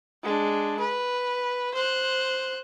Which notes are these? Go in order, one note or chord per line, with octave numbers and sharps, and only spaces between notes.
G#3 D4
B4
C5 F#6